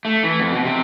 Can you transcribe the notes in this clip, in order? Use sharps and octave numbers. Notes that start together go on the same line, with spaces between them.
A3
E3
F2
B2
C3